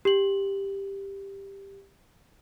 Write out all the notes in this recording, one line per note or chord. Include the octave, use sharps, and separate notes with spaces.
G4 F#7